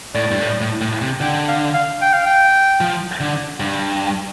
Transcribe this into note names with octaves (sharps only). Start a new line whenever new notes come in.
A2 D5
G2
A2
A2
A2
C3
D3 G5
F5
F5
G5
F5
G5
F3
D3
G2